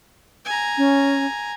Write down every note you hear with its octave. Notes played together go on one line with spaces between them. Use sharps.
G#5 A#5
C#4